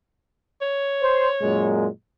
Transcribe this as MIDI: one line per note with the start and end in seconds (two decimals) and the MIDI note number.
0.62 1.71 73
1.02 1.29 72
1.42 1.87 42
1.42 1.87 46
1.42 1.87 56